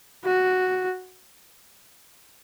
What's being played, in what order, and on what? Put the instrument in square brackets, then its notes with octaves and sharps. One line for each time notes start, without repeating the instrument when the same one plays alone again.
[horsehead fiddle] F#4